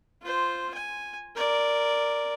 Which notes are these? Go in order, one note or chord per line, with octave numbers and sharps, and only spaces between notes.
F4 C5
G#5
A#4 D5